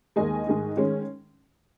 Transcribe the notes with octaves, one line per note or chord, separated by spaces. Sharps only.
D#2 D#3 G#3 D#5 G#5
G#2 D#3 G#3 D#4
D#3 G#3 C#4